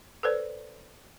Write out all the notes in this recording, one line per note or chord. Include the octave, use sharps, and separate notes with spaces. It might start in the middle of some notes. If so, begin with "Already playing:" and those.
A4 B4 C5 D5